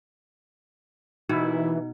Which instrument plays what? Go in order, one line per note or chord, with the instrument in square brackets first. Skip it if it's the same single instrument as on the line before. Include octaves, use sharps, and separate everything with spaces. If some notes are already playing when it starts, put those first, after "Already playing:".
[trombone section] D#2 E4 [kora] B2 [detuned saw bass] E3 [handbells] D#4